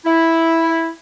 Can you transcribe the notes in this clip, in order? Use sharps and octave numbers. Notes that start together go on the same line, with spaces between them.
E4